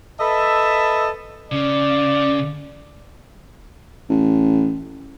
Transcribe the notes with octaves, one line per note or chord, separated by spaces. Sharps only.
A4 B4 D#5 E5 A5
C#3 D5
A1